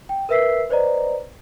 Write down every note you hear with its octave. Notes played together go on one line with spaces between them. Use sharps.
G5
A#4 B4 E5 E6 B6 C7
B4 C5 D5 D#5 A#5